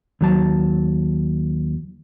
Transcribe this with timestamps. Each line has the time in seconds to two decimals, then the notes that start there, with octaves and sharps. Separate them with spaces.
0.21 D#2 F#3 A5